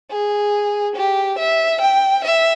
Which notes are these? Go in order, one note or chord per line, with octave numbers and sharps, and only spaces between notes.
G#4
G4
E5
G5
E5